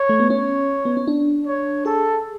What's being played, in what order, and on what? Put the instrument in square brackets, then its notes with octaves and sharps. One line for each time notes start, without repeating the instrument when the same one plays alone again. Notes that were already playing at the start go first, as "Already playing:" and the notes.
Already playing: [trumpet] C#5
[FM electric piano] A3
B3
[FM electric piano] C#4 [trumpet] C#5
[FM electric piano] B3
C#4
D4
[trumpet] C#5
[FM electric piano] G#4 [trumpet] A4